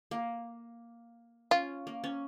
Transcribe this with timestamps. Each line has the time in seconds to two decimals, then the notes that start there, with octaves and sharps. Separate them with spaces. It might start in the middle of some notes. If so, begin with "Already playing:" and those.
0.11 A#3
1.51 C#4 F4
1.87 A#3
2.04 C#4